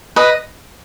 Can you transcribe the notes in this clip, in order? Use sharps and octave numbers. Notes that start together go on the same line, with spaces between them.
B4 D#5